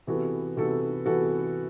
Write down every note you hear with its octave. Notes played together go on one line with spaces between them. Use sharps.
C3 E3 B3 F#4 A4
C3 E3 B3 F#4 A4
C3 E3 B3 F#4 A4